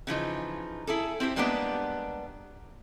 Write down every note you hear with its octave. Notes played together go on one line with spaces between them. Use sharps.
C#3 E3 F3 D#4
E4 G#4 A4
C4 E4 G4 C5
G3 G#3 A#3 B3 D4 G4